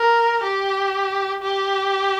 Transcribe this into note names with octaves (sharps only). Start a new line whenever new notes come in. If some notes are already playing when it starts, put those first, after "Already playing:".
Already playing: A#4
G4
G4